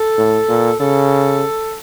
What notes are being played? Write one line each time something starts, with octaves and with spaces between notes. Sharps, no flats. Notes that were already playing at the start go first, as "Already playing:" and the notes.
Already playing: A4
A2
A#2
C#3 A4